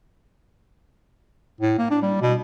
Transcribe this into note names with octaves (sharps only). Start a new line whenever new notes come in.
A2
A#3
D4
G3
B2